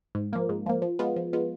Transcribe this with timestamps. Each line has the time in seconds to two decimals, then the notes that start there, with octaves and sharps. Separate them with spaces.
0.15 G#2
0.33 F3 A#3
0.49 G#2
0.66 F3 A#3
0.82 F3
0.99 G#3 B3 F4
1.16 F3
1.33 G#3 B3 F4